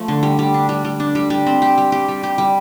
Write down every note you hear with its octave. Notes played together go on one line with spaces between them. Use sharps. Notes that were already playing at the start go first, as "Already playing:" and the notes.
Already playing: F3 A3
D3
G3
G3
D4
G3
G3
D4
G3
G3
C4
G4
G3
G4
G3
G4
G3